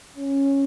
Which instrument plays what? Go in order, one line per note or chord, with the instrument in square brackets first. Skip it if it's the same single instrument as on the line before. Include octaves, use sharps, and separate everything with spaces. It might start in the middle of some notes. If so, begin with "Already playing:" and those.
[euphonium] C#4